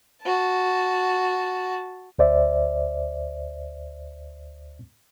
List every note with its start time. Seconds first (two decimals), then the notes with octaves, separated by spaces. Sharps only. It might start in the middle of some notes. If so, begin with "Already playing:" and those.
0.22 F#4 A5
2.19 D2 C5 D5 E5